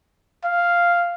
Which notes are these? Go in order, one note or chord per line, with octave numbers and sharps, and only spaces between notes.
F5